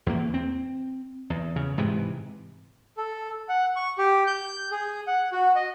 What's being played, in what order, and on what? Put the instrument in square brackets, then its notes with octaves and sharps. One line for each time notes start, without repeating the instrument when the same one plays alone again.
[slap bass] E2 A#3
C4
E2
C#3
G#2 C3 E3
[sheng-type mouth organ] A4
F#5
C#6
G4
G6
G#4
F#5
F#4
D#5